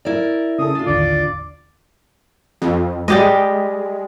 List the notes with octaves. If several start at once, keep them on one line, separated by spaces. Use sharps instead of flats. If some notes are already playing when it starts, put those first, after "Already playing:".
E4 A#4 D5
C#3 G#4 A4 D#6
D4 F4 A6
A1 D#2 D3 D5
F2
G3 G#3 G4 D#5